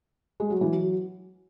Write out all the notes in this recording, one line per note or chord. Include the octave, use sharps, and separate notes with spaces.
G#3
F#3
E3
F#3